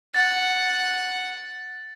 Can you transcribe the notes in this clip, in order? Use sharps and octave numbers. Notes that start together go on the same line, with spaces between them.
F#5 A6